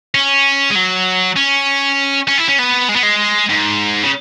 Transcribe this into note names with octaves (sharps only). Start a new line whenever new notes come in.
C#4
G#3
F#3
C#4
C#4
E4
C#4
B3
G#3
B3
G#3
G#2
C#3